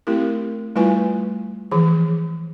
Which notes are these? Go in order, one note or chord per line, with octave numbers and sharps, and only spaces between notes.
A3 C4 E4 G4 A#4
G3 A3 E4 F4 B4 G#5
E3 F3 G#4